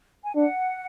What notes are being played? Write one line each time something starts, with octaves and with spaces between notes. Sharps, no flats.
G#5
D4 F#5